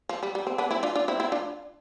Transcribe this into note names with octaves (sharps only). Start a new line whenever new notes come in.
F3
G3
G3
C4
B3 D4
C4 E4
D4 F4
D4 F4
C4 E4
C4 E4
D4 F4